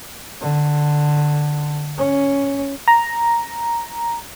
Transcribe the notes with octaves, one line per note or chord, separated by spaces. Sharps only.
D3
C#4
A#5